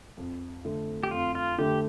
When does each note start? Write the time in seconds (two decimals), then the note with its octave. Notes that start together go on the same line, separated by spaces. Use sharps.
0.17 F2
0.65 D3 A3
1.03 G4
1.11 F2 F4
1.35 F4
1.58 D3 A3 G4